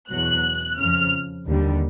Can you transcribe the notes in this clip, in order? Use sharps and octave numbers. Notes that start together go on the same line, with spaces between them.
E2 B2 F#3 F#6
F2 C#3 F3 F6
D#2 D3 G3